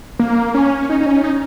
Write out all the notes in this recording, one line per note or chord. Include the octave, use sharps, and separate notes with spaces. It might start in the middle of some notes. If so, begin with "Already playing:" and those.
A#3
C#4
D#4
D#4
C#4
D#4